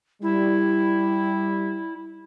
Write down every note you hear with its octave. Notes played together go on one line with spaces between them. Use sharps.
G3 E4